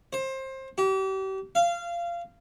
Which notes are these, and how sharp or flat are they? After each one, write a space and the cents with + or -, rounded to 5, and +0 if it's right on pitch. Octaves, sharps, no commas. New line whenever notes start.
C5 +25
G4 -35
F5 -20